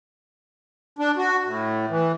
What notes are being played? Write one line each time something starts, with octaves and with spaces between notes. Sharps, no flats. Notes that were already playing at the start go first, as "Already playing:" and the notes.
D4
F#4
A2
E3